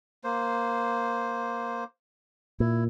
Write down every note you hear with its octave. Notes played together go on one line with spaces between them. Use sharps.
A#3 C5
A#2 E4